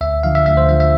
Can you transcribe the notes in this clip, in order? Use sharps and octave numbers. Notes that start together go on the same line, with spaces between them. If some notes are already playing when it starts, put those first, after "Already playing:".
D2 E5
D3 F3 F5
E5
D2 E5
C5
D3 F3 E5
E5